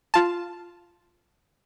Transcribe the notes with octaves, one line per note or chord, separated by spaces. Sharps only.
F4 A5